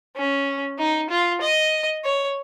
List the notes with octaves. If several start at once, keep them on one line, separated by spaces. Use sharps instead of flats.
C#4
D#4
F4
D#5
C#5